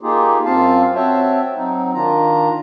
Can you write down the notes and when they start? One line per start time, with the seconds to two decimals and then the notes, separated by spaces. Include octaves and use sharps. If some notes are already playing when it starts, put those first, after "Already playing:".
0.01 A#3 D#4 F4 G4 G#4
0.45 F#2 C4 F4 F5 A5
0.95 C4 F#4 C#5 E5 G5 A5
1.55 F#3 C4 D#4
1.94 D#3 D4 F4 A#5